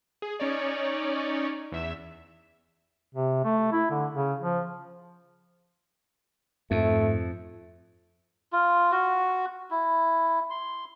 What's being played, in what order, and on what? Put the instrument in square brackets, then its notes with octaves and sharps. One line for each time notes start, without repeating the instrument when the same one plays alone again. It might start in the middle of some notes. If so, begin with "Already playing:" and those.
[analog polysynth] G#4
C#4 D#4 C#5 D5
E2 E5 E7
[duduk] C3
A3
E4
D3
C#3
F3
[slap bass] F2 [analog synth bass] G#2 [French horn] A3
[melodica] F4
F#4
E4
C6